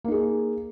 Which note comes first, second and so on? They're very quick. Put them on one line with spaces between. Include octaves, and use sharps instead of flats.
A#3 D#4 G#4